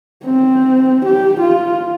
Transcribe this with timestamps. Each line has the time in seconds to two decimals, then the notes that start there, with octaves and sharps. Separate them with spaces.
0.25 C4
1.05 G4
1.40 F4